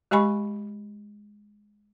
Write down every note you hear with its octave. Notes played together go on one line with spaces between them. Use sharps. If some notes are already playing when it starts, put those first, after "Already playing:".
G#3 G4 D#5 G#5 B5 C#6